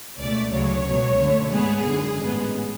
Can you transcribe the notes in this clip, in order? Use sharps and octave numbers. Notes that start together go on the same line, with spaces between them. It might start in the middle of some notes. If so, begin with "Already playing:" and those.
C#2 B2 A3 D5
D2 C#3 F#3 C#5
C#2 B2 F#3
F#2 D3 A3
G#2 G#3 B3 G#4
G#1 F#2 D3
A1 G#2 G#3 B3